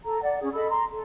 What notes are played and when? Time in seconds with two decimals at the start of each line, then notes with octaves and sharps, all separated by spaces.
0.05 A4 A#5
0.21 D5 F#5
0.40 C#4 G#4
0.53 A4 D#5 B5 E6
0.69 A#5 C6
0.91 A4